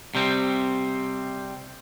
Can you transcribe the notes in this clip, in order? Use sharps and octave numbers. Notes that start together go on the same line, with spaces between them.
C3 G3 C4